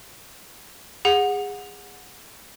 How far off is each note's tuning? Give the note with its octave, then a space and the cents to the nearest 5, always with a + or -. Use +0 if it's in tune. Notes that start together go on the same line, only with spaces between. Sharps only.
G#4 -25 F#5 -15